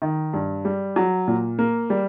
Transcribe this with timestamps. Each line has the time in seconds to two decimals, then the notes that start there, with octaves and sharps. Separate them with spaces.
0.02 D#3
0.33 G2
0.65 G3
0.96 F#3
1.28 A#2
1.59 A#3
1.90 G3